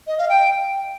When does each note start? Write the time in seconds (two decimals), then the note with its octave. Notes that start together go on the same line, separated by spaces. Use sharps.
0.07 D#5
0.18 F5
0.29 G5